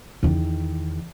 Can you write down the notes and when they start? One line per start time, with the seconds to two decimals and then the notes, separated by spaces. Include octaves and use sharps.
0.23 E2 D#3